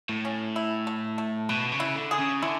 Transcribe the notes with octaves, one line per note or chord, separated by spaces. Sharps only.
A2
C#4
E4
A3
A3
B2 B4
C#3
E4
D3
G#4
C#3
D3 E4